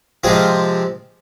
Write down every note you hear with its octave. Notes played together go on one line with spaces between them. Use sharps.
C3 F3 G#3 C4 F4 G#4